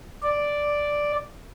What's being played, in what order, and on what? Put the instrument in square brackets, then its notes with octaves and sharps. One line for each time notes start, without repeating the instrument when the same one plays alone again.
[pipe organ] D5